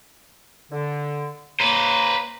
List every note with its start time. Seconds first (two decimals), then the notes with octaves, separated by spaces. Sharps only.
0.71 D3
1.60 C#3 A#3 B4 C5 A#5